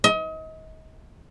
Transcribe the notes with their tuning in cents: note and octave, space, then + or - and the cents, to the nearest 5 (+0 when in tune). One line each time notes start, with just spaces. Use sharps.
D#5 +35